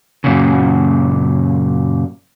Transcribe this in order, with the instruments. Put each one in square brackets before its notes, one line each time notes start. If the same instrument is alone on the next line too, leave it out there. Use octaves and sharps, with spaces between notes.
[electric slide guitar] F#2 A#2 C#3